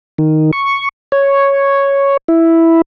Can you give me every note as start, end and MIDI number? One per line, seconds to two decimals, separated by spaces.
0.18 0.51 51
0.53 0.89 85
1.12 2.17 73
2.28 2.82 64